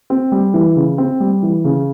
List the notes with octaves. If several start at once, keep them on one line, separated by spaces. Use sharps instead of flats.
C4
G3
E3
C#3
C4
G3
E3
C#3